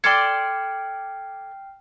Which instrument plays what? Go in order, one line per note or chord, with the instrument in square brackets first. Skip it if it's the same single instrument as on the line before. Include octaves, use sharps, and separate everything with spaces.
[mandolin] A4 D5 C6 [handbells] G5 F6 C7 [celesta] G#6 C#7